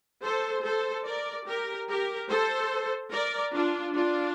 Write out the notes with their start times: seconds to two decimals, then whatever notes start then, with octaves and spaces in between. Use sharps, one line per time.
0.24 A4 C5
0.65 A4 C5
1.06 A#4 D5
1.47 G4 A#4
1.89 G4 A#4
2.30 A4 C5
3.12 A#4 D5
3.54 D4 F4
3.95 D4 F4